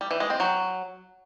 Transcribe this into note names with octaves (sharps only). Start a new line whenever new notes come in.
G3
E3
G#3
C4
F#3